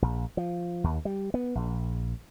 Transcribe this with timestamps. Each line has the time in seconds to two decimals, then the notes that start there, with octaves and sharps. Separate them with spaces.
0.02 A#1
0.37 F3
0.84 D#2
1.05 G3
1.34 B3
1.55 A#1